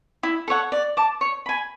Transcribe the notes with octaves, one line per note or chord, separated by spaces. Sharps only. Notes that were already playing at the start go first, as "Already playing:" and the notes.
E4
A4 C#5 F#5
D5
A5 D6
C#5
G#5 B5